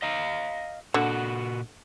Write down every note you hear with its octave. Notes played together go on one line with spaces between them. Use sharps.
D#5 F5 A#5
A#2 D3 F#4